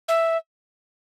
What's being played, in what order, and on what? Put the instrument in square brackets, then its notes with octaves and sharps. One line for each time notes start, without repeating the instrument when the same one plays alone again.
[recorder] E5